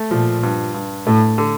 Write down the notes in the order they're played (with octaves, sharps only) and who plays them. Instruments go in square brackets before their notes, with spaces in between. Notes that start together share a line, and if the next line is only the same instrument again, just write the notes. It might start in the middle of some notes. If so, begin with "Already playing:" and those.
Already playing: [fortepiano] A3
[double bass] A#2 [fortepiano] F3
[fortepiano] G2
G2
[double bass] A2 [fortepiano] A3
[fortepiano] D3